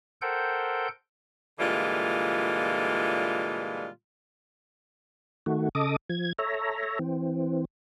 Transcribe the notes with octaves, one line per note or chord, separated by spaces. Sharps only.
A4 A#4 C5 F#5 G5 G6
A#2 D3 E3 G3 G#3 F4
D#3 A3 F#4
C#3 A4 D#5 D6 D#6
F3 G#6
A4 C#5 E5 A#5
E3 C4